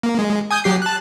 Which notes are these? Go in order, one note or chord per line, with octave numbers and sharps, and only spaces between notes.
A#3
G#3
G#5 D#6 G6
F#3 G4 C7
A5 F#6